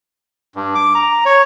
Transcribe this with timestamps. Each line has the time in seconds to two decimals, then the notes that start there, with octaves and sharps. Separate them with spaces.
0.55 G2
0.75 D6
0.95 A#5
1.25 C#5